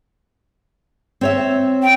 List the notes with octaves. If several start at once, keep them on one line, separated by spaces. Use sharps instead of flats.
C4 C#5 E5
G5